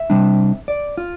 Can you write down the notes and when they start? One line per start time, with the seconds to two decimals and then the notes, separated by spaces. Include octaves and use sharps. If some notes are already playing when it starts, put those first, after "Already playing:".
Already playing: E5
0.10 C3 G3 D4
0.68 D5
0.97 F4